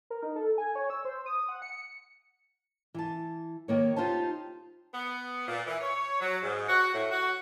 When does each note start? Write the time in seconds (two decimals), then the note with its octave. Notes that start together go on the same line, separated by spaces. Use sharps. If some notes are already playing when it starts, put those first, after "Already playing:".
0.10 A#4
0.23 D#4
0.36 A4
0.58 G#5
0.75 C#5
0.90 E6
1.05 C5
1.26 D#6
1.49 F#5
1.62 C#7
2.94 E3 A5
3.68 D#3 A#3 C#5
3.96 D#4 F4 G4 C5 A5
4.93 B3
5.48 A#2
5.67 E3
5.81 C#5
6.20 F#3
6.42 G#2
6.69 F#4
6.94 A2
7.11 F#4